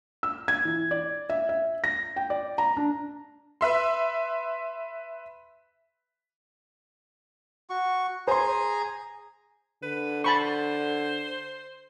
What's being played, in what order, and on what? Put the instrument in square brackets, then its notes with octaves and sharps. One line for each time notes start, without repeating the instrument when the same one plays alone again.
[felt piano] E6
G#6
E3
D5
E5
E5
A#6
G5
D5
A#5
D4
[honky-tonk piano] B4 E5 C6
[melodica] F#4 C#6
[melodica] G#4 G#5 A#5 [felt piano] C5 C6
[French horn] D3 [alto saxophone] B4
[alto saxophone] C5 [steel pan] A5 B5 C#6